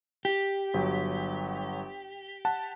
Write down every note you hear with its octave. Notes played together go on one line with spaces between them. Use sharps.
G4
G1 F#3
F#5 A5 F#6